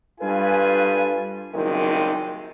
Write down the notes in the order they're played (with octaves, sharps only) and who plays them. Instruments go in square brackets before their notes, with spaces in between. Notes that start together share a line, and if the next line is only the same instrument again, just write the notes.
[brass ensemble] G2 F4 A4 B4 G#5
F#1 C2 A#2 D#3 G#3 C4